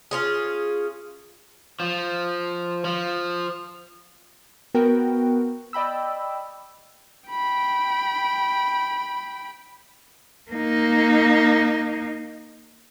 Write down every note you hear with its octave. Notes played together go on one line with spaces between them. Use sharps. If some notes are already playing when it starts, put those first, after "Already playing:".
C#4 F4 G#4
F3
F3
B3 F#4 A#4 G5
D5 D#5 G5 B5 E6
G5 B5
A#3 D#4